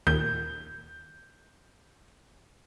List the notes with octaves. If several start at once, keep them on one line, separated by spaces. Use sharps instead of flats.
D#2 A#2 G6